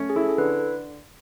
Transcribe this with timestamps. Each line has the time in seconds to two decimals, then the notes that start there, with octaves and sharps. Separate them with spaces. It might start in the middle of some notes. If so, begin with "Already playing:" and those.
Already playing: A3 C#4
0.10 G#4
0.16 E4 A4
0.29 A4
0.38 D3 B4